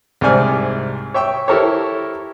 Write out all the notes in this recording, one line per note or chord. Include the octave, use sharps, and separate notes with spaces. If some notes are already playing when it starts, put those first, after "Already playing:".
C2 G#2 C4 D5 G#5 F6
C#5 E5 G5 C#6
E4 G4 A4 A#4 C5 C#5